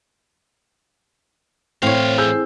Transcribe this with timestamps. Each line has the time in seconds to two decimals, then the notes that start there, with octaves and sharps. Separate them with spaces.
1.82 A2 E3 C4 C#5 F5
2.18 G#4 E6 G6